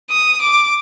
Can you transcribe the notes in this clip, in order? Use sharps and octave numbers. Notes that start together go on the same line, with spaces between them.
D#6
D6